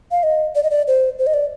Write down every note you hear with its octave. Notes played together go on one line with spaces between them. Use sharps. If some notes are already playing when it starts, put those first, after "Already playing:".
F5
D#5
D5
D#5
D5
C5
C5
D#5
D5